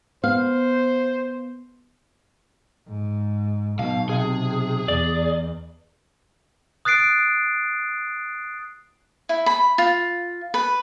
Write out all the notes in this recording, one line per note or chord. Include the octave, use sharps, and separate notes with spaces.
B3 C5 F5
G#2
B1 B2 F5
C3 G#4
E2 D5
D#6 F#6 A6 C7 D7
E4
B5
F4
B4